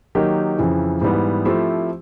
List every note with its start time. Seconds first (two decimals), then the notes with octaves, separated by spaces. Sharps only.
0.15 D#3 F#3 A#3 D#4 G4
0.59 F2 C#3 E3
1.01 G#2 E3 G3 B3
1.45 F3 A3 C4 E4 G4